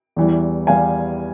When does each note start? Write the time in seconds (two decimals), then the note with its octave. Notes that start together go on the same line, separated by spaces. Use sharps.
0.16 E2 E3 G3
0.67 E2 E3 G3 F5 G#5